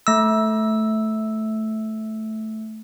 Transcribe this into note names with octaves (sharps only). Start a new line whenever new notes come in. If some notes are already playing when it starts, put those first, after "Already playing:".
A3 E6